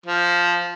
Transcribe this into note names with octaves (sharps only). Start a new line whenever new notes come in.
F3